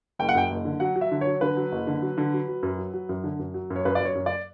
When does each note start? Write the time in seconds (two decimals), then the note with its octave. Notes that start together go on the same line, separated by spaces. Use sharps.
0.19 F#1 G5
0.29 F#5
0.35 F#2 G5
0.50 F#1
0.65 D3
0.80 F#3 F#5
0.96 F#3
1.01 E5
1.12 D3
1.21 C#5
1.26 F#3
1.41 D3 B4
1.57 F#3
1.72 F#1
1.87 D3
2.02 F#3
2.18 D3
2.33 F#3
2.48 F#3
2.63 F#2
2.78 F#3
2.94 F#3
3.09 F#2
3.24 D3
3.39 F#2
3.54 F#3
3.70 F#2
3.76 C#5
3.85 F#2 B4
3.95 F#2 D5
4.05 C#5
4.15 F#2
4.26 D5